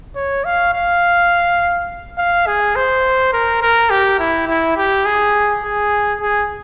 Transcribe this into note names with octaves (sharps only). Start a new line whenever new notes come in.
C#5
F5
F5
F5
G#4
C5
A#4
A#4
G4
E4
E4
G4
G#4
G#4
G#4